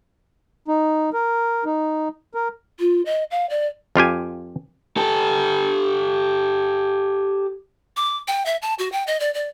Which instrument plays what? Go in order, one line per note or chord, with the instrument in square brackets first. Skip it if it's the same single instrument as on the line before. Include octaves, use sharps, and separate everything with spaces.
[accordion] D#4
A#4
D#4
A#4
[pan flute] F4
D#5
F5
D5
[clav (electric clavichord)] F2 F4 G4 G#5
[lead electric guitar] G4 A4
[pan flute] D6
G5
E5
A5
F#4
G5
D#5
D5
D5